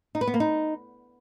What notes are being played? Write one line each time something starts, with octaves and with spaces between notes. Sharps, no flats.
D#4
B4
B3
A#3
D#4